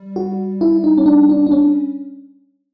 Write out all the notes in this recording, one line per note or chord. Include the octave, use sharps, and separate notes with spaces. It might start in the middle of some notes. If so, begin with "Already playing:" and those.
Already playing: G3
F#4
E4
D#4
C#4
D4
D4
D4
C#4